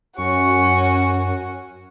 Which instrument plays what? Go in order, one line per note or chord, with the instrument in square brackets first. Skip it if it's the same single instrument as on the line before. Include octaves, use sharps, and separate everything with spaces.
[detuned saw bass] F#2 [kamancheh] C#4 F#4 [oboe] C#6